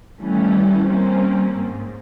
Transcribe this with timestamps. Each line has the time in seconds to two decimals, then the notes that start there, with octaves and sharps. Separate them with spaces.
0.20 D#3 E3 G3 A3 C#4
0.88 G3 A#3 C4 C#4
1.60 G#2